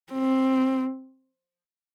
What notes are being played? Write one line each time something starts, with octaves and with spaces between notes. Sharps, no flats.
C4